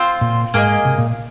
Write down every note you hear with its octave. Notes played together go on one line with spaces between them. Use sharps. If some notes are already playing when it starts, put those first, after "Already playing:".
Already playing: C4 F4 C5
A#2
G#2 A#3 G#4 D#5
C3
A#2